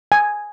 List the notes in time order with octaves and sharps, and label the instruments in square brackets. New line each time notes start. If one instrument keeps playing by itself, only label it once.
[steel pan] G#5